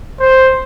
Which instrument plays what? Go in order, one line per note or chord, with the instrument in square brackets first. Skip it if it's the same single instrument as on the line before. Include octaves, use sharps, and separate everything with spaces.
[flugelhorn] C5